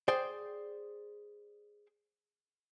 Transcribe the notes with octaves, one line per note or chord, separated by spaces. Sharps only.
G#4 C5 D5 G5